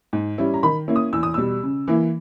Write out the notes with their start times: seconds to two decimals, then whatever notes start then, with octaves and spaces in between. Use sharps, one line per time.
0.13 G#2
0.38 G3 C#4 E4
0.54 A#5
0.63 D#3 B5
0.88 A#3 C#4 E4
0.96 D#6
1.13 E2 E6
1.23 D#6
1.34 B2 G3 E6
1.63 C#3
1.88 E3 A#3 E4